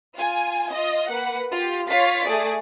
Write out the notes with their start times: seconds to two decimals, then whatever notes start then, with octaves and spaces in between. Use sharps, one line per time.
0.15 F4 G#5
0.71 F4 D#5
1.10 A#3 B4 F#5
1.52 F4 G4
1.89 F4 C#5 F5 A6 B6 C7
2.24 A3 G#4 D5